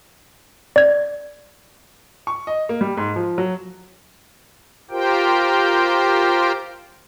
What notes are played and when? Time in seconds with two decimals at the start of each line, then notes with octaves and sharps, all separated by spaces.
0.76 D5 G#6
2.27 C#6
2.47 D#5
2.69 A#3
2.81 G3
2.97 G#2
3.16 F3
3.38 F#3
4.91 F4 G4 A#4 C5 G5